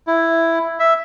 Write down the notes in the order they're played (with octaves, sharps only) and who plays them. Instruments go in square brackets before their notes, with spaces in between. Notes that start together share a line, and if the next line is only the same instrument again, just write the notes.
[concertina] E4
E5